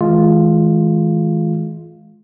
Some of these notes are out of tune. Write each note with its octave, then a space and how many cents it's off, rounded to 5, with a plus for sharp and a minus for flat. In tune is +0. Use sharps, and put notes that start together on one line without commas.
E3 -35 G#3 +30 F4 +0